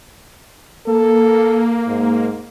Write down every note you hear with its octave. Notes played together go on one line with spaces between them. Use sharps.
A#3 A4
G#2